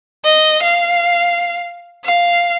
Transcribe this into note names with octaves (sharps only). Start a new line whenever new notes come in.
D#5
F5
F5